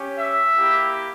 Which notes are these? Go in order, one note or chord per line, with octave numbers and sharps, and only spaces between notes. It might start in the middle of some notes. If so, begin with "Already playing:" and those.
Already playing: C#4 G4
E5
A#3 E4 G4